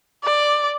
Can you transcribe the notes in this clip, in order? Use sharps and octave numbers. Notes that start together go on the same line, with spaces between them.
D5